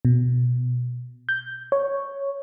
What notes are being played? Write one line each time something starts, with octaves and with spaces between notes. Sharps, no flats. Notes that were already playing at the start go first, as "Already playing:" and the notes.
B2
G6
C#5